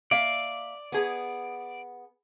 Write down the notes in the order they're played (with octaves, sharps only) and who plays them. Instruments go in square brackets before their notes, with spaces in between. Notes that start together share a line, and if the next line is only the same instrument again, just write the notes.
[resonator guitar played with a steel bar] A#3 E5 F5 [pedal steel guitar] D5
[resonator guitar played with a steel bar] B3 G#4